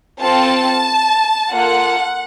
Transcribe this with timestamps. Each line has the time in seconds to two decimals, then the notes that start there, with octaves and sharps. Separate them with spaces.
0.21 C4 F4 A4 A5
1.51 A#3 F4 A4 F#5